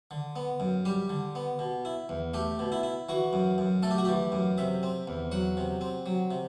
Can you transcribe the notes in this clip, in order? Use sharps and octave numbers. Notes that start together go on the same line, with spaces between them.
D3
B3
F#2
G3 G4
D3
B3
B2
E4
E2
A3 G4
B2
E4
E4
E3 F#4
F#2
F#2
A3 A4
G4
F#4
E3 G4
F#2
C3 E5
C4
E2
F#3 F#5
C3
C4
F#3
C3